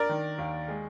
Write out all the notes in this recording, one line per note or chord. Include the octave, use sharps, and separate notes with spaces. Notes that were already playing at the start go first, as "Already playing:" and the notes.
Already playing: D4 A#4 D5
D#3
D#2
G#3